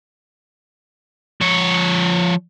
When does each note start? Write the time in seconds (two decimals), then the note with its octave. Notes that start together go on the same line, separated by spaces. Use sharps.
1.41 F3 C#5